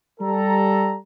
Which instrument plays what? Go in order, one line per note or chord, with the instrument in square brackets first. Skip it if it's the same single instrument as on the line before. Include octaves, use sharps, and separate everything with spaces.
[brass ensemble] G3 A4 A#5